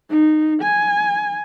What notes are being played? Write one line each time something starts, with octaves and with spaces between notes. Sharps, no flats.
D#4
G#5